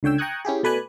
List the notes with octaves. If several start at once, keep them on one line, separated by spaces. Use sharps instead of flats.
C#2 D3 C#5 G5 E6
G5 A#5 C#6 D#6 F#6 G#6
C#4 E4 G4 G#4
B2 A3 B4 D5 G#5 F#6